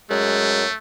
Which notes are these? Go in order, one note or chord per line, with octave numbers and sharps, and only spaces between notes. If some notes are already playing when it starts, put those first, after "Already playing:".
F#2 G#3 A3